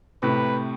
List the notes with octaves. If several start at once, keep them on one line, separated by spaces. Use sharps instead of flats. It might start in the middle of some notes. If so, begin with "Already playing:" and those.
A2 C3 B4